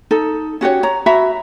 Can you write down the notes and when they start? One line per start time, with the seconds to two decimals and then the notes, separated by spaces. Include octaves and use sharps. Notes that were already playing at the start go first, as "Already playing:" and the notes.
0.11 D#4 A4
0.61 C#4 F#4 G4 C#5
0.83 C#5 A#5
1.06 F#4 E5 A#5 B5